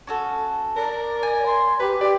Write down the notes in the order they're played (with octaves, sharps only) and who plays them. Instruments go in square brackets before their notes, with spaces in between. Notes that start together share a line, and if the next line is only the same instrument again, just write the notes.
[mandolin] C#4 F#4 A4
[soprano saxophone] A#4 [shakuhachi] D5
[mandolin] G#5
[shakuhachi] C6
[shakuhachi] G4 [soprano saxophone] B4
[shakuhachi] G4 [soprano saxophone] D5